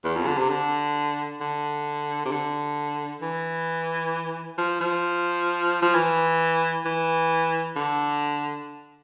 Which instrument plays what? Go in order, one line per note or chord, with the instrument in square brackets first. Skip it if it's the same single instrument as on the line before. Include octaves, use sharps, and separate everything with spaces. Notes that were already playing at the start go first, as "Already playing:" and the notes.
[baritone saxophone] E2
F2
D3
C3
D3
D3
C3
D3
E3
F3
F3
F3
E3
E3
D3